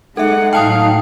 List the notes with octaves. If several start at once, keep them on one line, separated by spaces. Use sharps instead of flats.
G#3 D#4 A4 E5 F#5
A2 F#3 F5 G5 A5 D#6